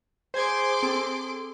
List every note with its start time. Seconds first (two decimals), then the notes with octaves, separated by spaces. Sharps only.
0.34 G#4 C5 G#5 C6 D6 G#6
0.83 C4 A4